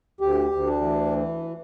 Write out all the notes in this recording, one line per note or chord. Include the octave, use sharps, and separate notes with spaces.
D2 G4
D2
D4
E3